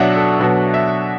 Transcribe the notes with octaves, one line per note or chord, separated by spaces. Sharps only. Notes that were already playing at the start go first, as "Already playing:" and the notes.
Already playing: B2 F#3 D4 E5 F#5
A4
B2 F#3 D4
E5